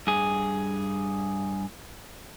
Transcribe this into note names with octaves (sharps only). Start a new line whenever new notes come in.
G2 G#4